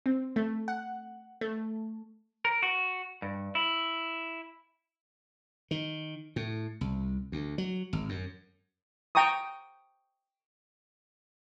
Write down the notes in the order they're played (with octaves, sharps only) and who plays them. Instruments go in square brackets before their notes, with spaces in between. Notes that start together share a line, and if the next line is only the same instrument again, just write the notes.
[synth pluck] C4
A3
F#5
A3
[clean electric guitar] A#4
F#4
G2
E4
[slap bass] D#3
A2
C2
D2
F#3
G#1
F#2
[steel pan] G5 A#5 C#6 D#6